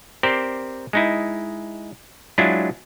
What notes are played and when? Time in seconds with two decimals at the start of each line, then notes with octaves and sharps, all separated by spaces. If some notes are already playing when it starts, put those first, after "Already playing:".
0.23 C4 G4 A#4 C5 D5
0.93 G#3 D#4 E4
2.38 F#3 G#3 D4 E4 F4